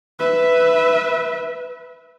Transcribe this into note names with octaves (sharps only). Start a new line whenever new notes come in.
B4 E5